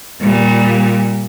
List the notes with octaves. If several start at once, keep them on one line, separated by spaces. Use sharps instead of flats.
A#2 G3